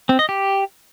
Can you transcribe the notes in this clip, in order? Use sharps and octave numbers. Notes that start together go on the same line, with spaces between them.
C4
D#5
G4